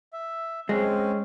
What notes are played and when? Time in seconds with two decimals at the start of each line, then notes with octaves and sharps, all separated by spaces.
0.13 E5
0.69 G#3 C4 C#4